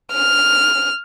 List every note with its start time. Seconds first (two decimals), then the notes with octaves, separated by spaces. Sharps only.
0.14 F6